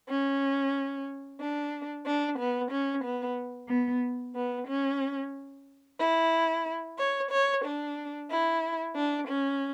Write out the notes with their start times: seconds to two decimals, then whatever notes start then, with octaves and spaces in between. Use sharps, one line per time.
0.08 C#4
1.40 D4
2.05 D4
2.38 B3
2.71 C#4
3.04 B3
3.69 B3
4.35 B3
4.68 C#4
5.99 E4
6.98 C#5
7.31 C#5
7.64 D4
8.30 E4
8.96 D4
9.28 C#4